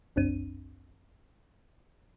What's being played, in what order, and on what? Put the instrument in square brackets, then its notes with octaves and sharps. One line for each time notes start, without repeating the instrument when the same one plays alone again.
[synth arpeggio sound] G1 C2 F#2 C4 D4 D#7